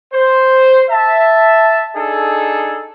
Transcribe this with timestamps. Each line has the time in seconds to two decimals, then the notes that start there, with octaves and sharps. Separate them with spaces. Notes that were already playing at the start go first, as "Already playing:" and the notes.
0.12 C5
0.90 E5 A5
1.95 D4 D#4 G#4 A4